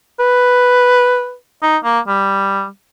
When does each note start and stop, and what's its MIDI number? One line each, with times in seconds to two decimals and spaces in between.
0.20 1.35 71
1.62 1.77 63
1.84 1.99 58
2.07 2.67 55